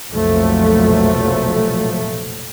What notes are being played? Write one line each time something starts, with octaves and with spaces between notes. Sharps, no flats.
F1 B1 A#2 F3 F#3 A3